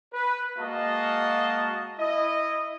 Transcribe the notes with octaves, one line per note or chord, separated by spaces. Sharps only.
B4
G#3 A#3 F#4 D#5 F5 A5
E4 D#5